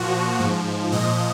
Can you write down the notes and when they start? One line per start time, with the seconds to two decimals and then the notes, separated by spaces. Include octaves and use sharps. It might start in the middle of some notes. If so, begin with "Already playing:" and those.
Already playing: A#2 F3 F#4
0.39 G#2 F3
0.92 A#2 F3 D#5